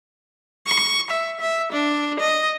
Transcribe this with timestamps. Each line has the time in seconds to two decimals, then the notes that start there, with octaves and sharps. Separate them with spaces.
0.67 C#6
1.11 E5
1.40 E5
1.72 D4
2.20 D#5